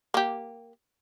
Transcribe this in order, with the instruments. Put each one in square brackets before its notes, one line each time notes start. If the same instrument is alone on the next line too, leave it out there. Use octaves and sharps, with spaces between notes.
[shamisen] A#3 G4